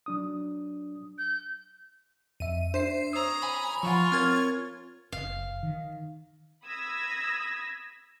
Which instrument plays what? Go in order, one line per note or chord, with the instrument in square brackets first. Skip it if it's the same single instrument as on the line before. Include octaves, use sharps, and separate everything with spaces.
[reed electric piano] F#3 D4 D#6
[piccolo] G6
[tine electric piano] F2 E5 [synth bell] D#7
[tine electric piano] D4 E5 [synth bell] C5 C7
[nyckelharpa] C#5 A#5 [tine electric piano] D#6 E6
[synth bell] G#5 B5
[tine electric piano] F3 F5 F#5 [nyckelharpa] F4 C#6
[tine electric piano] C4 A#4 C#5 [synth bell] F6 G#6 A6
[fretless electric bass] F#1 [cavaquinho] F5
[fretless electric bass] D#3
[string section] B5 D#6 E6 G#6 A#6 B6